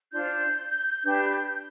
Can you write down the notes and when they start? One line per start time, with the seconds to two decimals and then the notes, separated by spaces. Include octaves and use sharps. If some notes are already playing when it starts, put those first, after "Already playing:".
0.12 D4 F4 C5 G6
1.04 D4 G4 B4